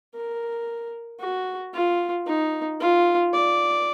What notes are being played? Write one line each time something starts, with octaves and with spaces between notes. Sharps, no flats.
A#4
F#4
F4
D#4
F4
D5